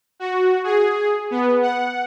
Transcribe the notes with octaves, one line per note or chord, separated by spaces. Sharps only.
F#4
G#4
B3
F#5